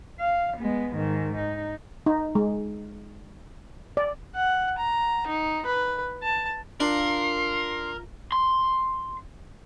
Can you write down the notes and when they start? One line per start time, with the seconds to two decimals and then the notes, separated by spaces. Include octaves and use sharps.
0.19 F5
0.58 G#3 B3
0.96 G#2 D#3
1.37 D#4
2.06 D#4
2.35 G#3
3.97 D5
4.35 F#5
4.78 A#5
5.27 D#4
5.66 B4
6.23 A5
6.80 D4 F4 A#4 C6
8.32 C6